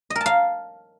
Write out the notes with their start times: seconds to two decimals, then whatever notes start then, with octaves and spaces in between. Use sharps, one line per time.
0.10 D#5
0.15 A#4
0.21 A5
0.26 F5